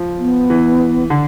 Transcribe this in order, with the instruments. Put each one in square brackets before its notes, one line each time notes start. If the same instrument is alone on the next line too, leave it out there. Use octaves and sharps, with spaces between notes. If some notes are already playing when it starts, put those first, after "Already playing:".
Already playing: [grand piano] F3
[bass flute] B3
[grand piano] E3
D3